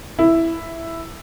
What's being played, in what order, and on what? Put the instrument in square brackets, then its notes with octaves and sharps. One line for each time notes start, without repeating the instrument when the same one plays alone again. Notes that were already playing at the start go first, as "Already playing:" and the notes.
[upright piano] E4